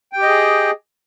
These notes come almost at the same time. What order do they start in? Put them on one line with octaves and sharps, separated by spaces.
G5 G4 D#5 G#4